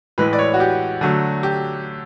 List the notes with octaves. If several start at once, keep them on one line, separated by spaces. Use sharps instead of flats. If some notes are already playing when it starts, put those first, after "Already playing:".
A2 E3 G#3 B4
D5
C#5
F#4
G4
D3 F#3 A3
G4